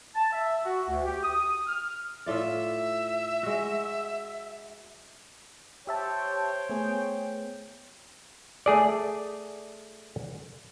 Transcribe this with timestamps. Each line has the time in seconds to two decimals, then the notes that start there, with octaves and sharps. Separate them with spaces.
0.15 A5
0.33 E5
0.64 F#4
0.88 D2
1.05 G4
1.23 D#6
1.67 F6
2.26 A2 F4 D5 E5
3.43 G#3 F#4
5.87 G4 C5 C#5 E5 G5 A5
6.69 A3 B3 G#4
8.66 A3 G#4 D5